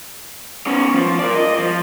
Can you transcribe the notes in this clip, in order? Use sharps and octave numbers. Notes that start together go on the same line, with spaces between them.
B3 C#4
F3
A#4 D5
D#5
F3